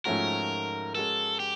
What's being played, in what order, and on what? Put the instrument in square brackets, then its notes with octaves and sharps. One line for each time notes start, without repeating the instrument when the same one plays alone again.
[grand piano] G#2 F3 A3 C#4 F#4 [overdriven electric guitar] A#4
[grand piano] G#3 C#4 F#4 A#4 [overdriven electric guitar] A4
[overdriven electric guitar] G4